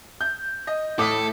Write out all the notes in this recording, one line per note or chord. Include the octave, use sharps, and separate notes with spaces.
G6
D#5
A2 A4 D6 D#6 B6